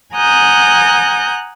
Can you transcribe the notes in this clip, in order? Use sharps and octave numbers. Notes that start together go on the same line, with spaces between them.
F#5 G#5 A#5 D#6 F#6 G6